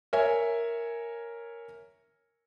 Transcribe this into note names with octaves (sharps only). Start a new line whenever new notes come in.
A#4 C#5 E5 G#5